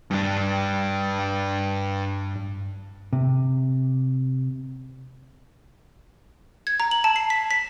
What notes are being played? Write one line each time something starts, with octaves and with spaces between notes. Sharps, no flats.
G2 D4
C3
G#6
A#5
F#7
A5
C7
B6
B6